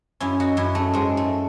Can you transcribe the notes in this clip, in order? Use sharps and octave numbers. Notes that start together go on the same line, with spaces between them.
F#2 C#4 E4
D#4 F#4
F#2 C#4 E4
A3
G#2 G#3
A3